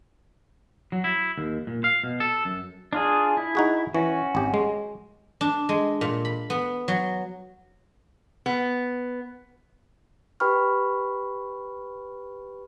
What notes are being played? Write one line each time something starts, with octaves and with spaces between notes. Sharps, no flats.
F#3
E4
D#2
A#2
F5
B2
A4
F#2
D4 F4 G#4
E4
D#4 F#4 G#4
E3 C#4 F#4
G#1 G4
G#3
D4
G#3
A#2
B5
B3
F#3
B3
G4 B4 G5 B5 C#6 F6